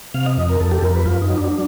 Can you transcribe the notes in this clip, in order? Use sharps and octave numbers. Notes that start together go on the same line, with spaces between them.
C3 F5
D#5
F2 D#5
A#4
F2 A4
G4
A4
F2 A#4
B4
F#2 F4
D#4
F#3
D4
D4